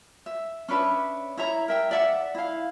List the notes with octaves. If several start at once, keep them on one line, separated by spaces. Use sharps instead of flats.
E5
C#4 D4 B4 E5
E4 C#5 E5 A#5
A#4 E5 G5
D5 E5 F#5
E4 F5